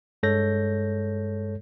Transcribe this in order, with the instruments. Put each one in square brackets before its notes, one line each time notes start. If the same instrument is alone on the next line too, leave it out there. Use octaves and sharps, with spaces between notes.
[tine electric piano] G2 G#3 A4 C#5 G6 A#6